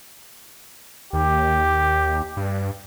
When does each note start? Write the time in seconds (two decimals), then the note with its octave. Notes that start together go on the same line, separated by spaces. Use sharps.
1.13 D#2 G4
2.37 G2